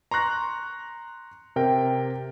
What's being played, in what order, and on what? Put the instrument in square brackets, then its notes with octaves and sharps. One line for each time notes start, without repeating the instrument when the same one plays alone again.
[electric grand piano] A#5 C6 C#6 F#6 A#6
C3 A#4 G5